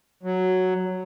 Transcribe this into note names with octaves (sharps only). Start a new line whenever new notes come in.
F#3